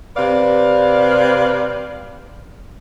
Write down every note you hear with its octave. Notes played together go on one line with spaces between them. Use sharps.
C3 B4 D5 F5